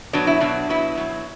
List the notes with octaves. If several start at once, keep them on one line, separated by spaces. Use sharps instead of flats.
B2 F#3 D4
E4
B2 F#3 D4
B2 F#3 E4
B2 F#3